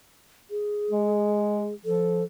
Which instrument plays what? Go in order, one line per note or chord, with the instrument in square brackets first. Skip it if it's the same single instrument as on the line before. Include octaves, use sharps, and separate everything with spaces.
[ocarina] G#4
[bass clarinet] G#3
[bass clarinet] F3 [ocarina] A4